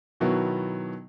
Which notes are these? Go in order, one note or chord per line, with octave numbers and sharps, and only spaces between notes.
B2 D#3 F#3 B3 E4